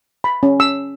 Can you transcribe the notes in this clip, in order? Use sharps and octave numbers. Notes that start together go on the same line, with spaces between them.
B5
C#4
E6